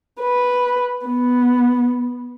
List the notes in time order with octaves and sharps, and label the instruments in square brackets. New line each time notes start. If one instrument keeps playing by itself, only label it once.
[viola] B4
B3